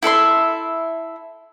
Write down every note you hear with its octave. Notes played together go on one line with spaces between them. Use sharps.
E4 A4 E5 C6